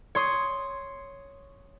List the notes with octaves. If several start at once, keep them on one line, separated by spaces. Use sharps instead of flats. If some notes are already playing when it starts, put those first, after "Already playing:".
C#5 C6 D#6